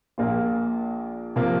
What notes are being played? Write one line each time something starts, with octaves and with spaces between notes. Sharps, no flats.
A#1 A#2 A#3 F4
C3 F3 A#3